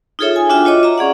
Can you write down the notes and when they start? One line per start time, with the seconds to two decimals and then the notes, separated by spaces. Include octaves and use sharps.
0.19 D#4 F4 G#4 A4 C#5 E5
0.36 G#5
0.50 D4 F4 F#4 E5 G5
0.65 F4 C#5 D#5 D6
0.83 E5 A#5
0.98 C#4 G#4 D5 F#5